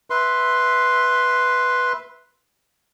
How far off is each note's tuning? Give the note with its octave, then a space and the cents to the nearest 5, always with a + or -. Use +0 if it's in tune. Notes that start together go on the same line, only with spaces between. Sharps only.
B4 +0 E5 +0 C6 +0